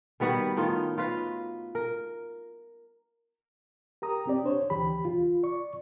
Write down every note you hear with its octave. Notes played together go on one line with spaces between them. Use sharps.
D#3 G3 B3 F#4
A2 D#3 D#4 F4
F4 F#4 B4 F5
A#4
G4 A#4 A#5 D#6
C4 G4 D5
D4 C5 C#5
D2 E3 G4 B5
F4
D5 C#6